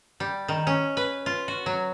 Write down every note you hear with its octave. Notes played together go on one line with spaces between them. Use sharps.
G3
D#3
C#4
B4
F4
F#4
F#3